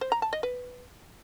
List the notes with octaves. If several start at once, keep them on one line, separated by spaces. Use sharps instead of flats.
C5
A#5
A5
D#5
B4